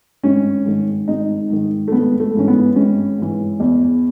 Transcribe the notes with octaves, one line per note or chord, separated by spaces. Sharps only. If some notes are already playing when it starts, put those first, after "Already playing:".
G#1 C#4
G#2 D#3
G#1 D#4
G#2 D#3
A3
G#1 B3
A3
G#2 E3 C#4
B3
G#1 C#4
G#2 E3
E2